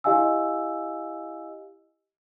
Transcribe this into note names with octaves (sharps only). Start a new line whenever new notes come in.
E4 G4 D#5 F5 G#5 E6